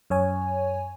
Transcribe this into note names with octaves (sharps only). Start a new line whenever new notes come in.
F#2 C#5 G#5